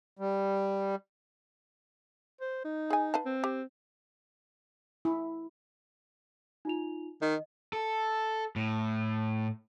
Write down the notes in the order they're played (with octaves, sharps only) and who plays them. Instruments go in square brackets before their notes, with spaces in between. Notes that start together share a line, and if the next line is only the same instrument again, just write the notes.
[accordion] G3
[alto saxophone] C5
D#4
[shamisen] G#4 G#5
B4 F5 A5
[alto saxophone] C4
[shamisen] G4
[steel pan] E4
[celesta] D#4 F4 F7
[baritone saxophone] D#3 [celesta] D#5
[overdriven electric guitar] A4
A2